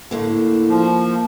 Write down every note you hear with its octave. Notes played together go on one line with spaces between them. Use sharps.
A2 D3 A#3
F3